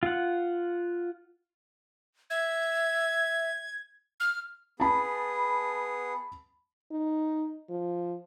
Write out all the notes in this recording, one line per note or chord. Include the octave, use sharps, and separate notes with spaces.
F4 F#5
E5 G#6
F6
B3 G#4 A5 B5
D#4
F3